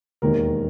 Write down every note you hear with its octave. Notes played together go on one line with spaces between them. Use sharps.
E1 D#2 D#3 A#4